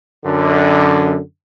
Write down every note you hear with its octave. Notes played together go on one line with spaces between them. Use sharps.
F#2 D3